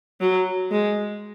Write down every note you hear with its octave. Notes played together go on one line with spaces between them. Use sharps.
F#3
G#3